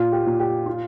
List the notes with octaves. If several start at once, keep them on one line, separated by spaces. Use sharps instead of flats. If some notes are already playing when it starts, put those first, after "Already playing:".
Already playing: A#2 F4
G4
A#2
G4
F4